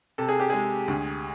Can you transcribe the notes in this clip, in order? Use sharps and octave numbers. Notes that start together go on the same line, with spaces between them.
C3 A4
G#4
G4
G#3 G#4
D2